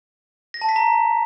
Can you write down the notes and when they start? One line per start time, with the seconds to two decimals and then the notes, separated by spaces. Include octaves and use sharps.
0.54 A#6
0.61 A5
0.69 B6
0.76 A#5